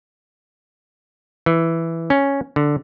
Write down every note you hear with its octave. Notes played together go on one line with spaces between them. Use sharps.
E3
C#4
D3